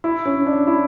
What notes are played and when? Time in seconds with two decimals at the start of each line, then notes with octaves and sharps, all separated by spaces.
0.04 E4
0.26 C#4
0.46 D4
0.67 E4